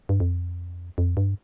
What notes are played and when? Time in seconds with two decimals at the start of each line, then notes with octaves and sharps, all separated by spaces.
0.09 G2
0.20 F2
0.98 F2
1.17 G2